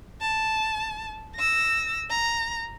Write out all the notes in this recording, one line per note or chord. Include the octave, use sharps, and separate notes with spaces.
A5
E6 A#6
A#5